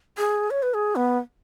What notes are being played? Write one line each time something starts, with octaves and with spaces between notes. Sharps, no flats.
G#4
C#5
B4
G#4
B3